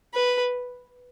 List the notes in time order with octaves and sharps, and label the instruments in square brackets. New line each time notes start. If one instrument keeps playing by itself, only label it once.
[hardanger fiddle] B4